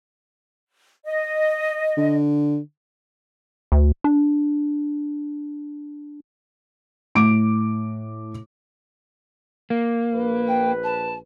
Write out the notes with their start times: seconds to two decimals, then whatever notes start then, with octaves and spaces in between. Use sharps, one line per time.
1.05 D#5
1.97 D3
3.72 D2
4.04 D4
7.15 A2 D6 D7
9.70 A#3
10.14 A#1 B4
10.48 G5
10.84 A5